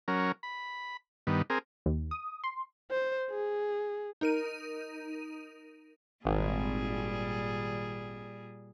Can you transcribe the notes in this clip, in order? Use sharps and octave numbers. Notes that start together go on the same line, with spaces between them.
F#3 C#4 A#4
B5
G2 D#3 B3
C4 G#4 A#4
D#2
D#6
C6
C5
G#4
D#4 A#4 D#7
G#1 A#2 G3 G#4